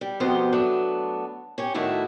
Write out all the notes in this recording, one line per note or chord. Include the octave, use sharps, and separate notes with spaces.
G3
F2 B2 F3 B3 G4 C5
F#3 A3 B3 D4
C#4 G4 C#5
A2 D#3 A3 D4 E4 F#4